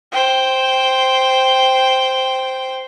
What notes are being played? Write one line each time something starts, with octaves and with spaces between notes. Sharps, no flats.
C5 G5